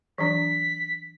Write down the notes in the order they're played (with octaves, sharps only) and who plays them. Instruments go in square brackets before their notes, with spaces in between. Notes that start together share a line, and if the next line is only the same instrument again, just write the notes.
[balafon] E3 F#3 D4 [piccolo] B6